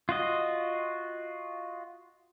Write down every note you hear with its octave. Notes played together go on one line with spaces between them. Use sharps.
F4 F#4 D#5